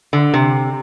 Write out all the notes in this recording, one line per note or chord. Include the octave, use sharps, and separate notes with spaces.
D3
C3